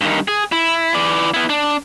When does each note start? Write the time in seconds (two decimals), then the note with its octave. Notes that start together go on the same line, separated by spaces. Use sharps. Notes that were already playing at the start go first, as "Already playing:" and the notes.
0.01 G2 D#3
0.28 G#4
0.52 E4
0.94 E3 D5
1.34 B3 E4
1.49 D4